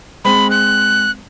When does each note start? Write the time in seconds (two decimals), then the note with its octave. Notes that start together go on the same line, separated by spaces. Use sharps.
0.25 G#3 C4 B5
0.50 F#6